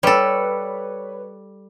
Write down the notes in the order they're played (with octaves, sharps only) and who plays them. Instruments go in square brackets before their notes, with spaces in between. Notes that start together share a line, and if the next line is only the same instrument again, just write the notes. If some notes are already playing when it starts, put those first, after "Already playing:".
[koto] G3 A4 [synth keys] B4 C#5